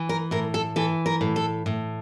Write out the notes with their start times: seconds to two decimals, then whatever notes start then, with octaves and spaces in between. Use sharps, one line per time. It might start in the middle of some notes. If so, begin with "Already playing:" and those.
Already playing: E3
0.09 A#4
0.31 A2 A#4
0.54 A4
0.76 E3 A4
1.06 A#4
1.21 A2
1.36 A4
1.66 A2